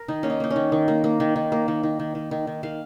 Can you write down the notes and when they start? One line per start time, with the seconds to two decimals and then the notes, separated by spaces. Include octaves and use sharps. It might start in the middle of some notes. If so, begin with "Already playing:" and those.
Already playing: A#4
0.08 D#3 D#4
0.23 A#3 C#4
0.30 D#4
0.40 A#3 D#4
0.50 C#4
0.56 D#3
0.72 D#3
0.88 A#3
1.04 A#3
1.20 D#3
1.36 D#3
1.52 A#3
1.68 D#3
1.83 D#3
2.00 D#3
2.15 D#3
2.31 D#3
2.47 D#3
2.63 D#3 F5